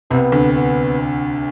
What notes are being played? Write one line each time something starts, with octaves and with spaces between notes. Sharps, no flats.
C2 C3 B3
D2 D3
B3